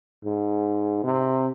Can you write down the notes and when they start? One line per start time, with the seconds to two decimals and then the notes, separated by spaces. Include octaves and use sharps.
0.25 G#2
1.04 C3